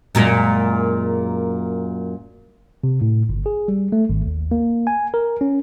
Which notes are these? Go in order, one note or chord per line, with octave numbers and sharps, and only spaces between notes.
F#2 A#2 G#3
C3
A2
G1
G#4
G3
A3
G#1
D#2
A#3
G#5
A#4
C#4